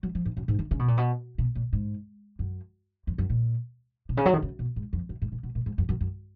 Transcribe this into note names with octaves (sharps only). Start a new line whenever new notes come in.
F#3
F3
G#2
F#2
G#2
D#3
C#3
B2
A#2
B2
B2
A#2
G#2
F#2
F2
F#2
A#2
B2
C#3
F#3
D#3
C#3
B2
G#2
F2
F#2
G#2
A#2
B2
A#2
G#2
F#2
F#2
F#2